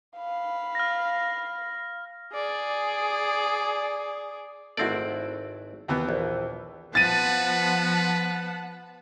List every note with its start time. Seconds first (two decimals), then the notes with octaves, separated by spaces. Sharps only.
0.18 F5 B5
0.75 F6 A#6
2.34 G#4 D5
4.77 G#1 A3 C4 E4 F#4 D5
5.88 D#2 E3 B3
6.09 A#1
6.95 F3 B3 B4 F#5 A5 A6 D#7